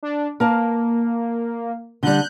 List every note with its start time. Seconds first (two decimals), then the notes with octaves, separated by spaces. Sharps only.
0.03 D4
0.40 A#3 A#4 A5
2.03 D3 G3 F#6 G6